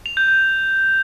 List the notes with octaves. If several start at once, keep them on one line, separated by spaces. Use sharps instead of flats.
F7
G6
G6